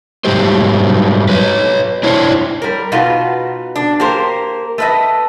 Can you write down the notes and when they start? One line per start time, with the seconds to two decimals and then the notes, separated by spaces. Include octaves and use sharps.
0.25 G#2 F#3 G3 G4 C5
1.29 B4 C#5
2.03 D4 E4 C5 C#5
2.62 G3 A#4
2.92 B2 B3 D#4 F4 F#4
3.76 D4
4.00 A#3 G4 A#4 C5
4.78 A3 B4 D#5